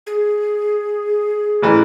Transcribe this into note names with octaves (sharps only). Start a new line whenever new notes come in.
G#4
A1 E3